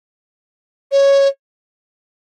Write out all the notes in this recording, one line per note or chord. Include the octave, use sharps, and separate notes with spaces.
C#5